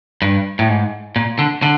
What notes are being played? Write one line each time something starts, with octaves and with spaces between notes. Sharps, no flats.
G2
A2
G#2
A#2
D3
D3